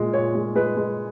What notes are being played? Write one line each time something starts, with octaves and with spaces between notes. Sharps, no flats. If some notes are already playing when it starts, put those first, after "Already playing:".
Already playing: A#2 G#3
A#2 C#5
G#3
G#3 B4
G#3